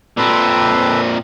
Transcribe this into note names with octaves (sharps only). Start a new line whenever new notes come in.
A#2 C4 A4 B4